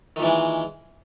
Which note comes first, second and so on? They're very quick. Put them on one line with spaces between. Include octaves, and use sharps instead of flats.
D#3 A#2 E3 G#3